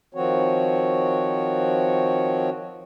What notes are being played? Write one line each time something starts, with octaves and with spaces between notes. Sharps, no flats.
D#3 F3 C4 F#4 C#5